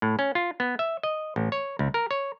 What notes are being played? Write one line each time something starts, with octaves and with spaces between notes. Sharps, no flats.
A2
C#4
F4
B3
E5
D#5
A1
C#5
C#2
A#4
C#5